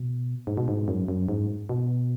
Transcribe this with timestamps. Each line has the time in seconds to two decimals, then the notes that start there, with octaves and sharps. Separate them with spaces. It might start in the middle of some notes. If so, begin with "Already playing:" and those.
Already playing: B2
0.47 G#2
0.57 B2
0.68 G#2
0.88 F#2
1.08 F#2
1.29 G#2
1.69 B2